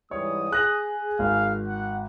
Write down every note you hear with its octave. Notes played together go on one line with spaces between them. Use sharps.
G#2 E3 G3 C#5 D#6
G#4 F#6 A#6 F#7
G#1 F5
F#5